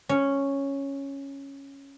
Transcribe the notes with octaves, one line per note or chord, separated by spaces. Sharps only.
C#4